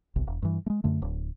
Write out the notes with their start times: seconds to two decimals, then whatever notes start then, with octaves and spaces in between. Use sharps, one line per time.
0.16 G1 C2
0.27 E1
0.42 G2 E3
0.66 G#3 A3
0.84 F#2 D3 A3
1.02 D1